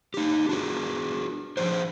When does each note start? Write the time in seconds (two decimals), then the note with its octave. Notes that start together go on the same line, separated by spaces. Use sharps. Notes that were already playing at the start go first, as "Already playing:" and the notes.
0.14 D#4 G4
0.49 D4 F#4 G#4
1.57 F3 D4 G4 G#4 C5